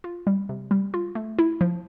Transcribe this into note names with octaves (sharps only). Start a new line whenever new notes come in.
F4
G3
C3
G3
F4
A3
E4
F3